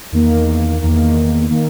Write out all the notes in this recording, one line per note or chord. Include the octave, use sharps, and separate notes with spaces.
E2 D#3 A#3
E2 D#3 A#3
D#3 A#3